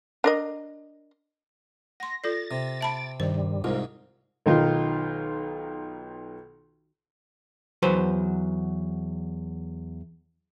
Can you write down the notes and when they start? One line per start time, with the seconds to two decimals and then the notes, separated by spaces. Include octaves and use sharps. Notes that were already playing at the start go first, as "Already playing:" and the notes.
0.24 D4 A#4 D#5
2.00 F#5 C6 A#6
2.24 F4 A4 D5 A6 A#6
2.51 C3
2.81 E5 A5 B5 D7
3.20 G2 D#3 G3 C5
3.64 C2 G#2 F4 A#4
4.46 B1 D#3 F4
7.82 E2 F#3 B4 C5